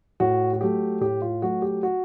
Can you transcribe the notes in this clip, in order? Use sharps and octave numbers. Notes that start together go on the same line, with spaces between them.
A2 F#4
F#4
F#3 A3 G4
A2 G4
F4
F#3 A3 F#4
G4
F#4